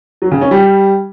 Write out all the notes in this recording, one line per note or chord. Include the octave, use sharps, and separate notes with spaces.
F#3
C#3
C#4
G3